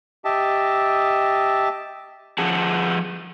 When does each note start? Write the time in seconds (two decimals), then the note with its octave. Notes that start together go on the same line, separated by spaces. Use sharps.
0.25 G4 D#5 E5 A5
2.38 F3 G#4 F#5 A5